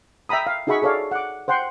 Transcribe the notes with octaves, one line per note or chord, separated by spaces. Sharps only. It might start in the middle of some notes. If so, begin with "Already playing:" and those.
E5 G5 A#5 B5 D#6
F5
D#4 F#4 G#4 E5 B5 C#6
G#4 A4 C#5 D5 F5
F#5 D6
C5 F#5 G5 C6